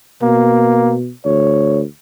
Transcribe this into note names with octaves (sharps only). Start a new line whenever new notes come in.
B2 A#3
D2 C#5